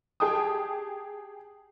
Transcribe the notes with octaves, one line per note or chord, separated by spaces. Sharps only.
G4 G#4 G5 A5 D#6